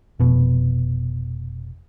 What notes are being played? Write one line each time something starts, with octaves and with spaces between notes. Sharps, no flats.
F1 B2